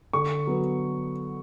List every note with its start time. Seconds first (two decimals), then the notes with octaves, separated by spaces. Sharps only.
0.13 D3 C#6
0.47 F#3 B3